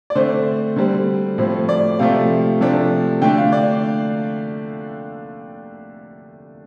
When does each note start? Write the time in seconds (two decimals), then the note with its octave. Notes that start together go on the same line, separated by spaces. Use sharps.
0.10 D5
0.15 D3 A3 C4 C5
0.76 D3 G3 C4
1.38 A2 F3 C4
1.69 D5
1.99 C3 F3 A3 F5
2.61 C3 F3 A3 D4
3.21 D3 A3 D4 G5
3.37 F5
3.52 D5